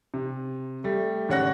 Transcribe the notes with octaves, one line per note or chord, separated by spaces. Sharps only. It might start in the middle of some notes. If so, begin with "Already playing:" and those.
C3
G3 A3
G#1 C#3 C#5 F#5 F#6 A#6